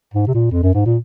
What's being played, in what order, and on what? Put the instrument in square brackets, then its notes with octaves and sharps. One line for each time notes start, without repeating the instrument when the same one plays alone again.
[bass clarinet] G#2
C3
A#2
F2
F#2
G#2
A#2